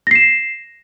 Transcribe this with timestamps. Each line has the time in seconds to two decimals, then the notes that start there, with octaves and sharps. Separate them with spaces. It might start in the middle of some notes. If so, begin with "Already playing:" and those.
0.07 A#6
0.11 C7
0.15 E7